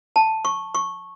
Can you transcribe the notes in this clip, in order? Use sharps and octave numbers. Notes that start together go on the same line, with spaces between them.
A5
C#6
C#6